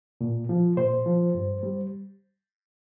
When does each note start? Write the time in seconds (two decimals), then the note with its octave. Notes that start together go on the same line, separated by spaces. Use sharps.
0.21 A#2
0.49 F3
0.77 A#2 C5
1.06 F3
1.34 G2
1.63 G3